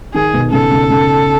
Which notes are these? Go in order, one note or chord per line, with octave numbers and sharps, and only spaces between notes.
D#3 G#4
B2
C#3 A4
C#3
C#3